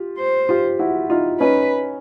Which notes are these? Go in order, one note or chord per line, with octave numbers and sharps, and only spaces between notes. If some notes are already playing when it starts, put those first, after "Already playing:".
Already playing: F4 G4
C5
F4 G4
E4 F#4
D#4 F4
C#4 D#4 B4